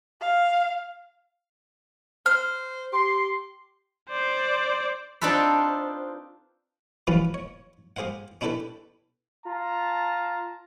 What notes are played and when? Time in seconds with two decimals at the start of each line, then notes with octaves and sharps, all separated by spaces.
0.21 F5
2.26 C5 F6
2.93 G4 C6
4.09 C5 D5
5.21 C4 D4 D#4 F4 A4 B4
7.07 E3 F3 G3 C#4 F4 B4
7.34 C#5
7.96 G4 G#4 C5 F5 F#5
8.41 C#4 D4 E4 G4 A4 B4
9.46 F4 A5 A#5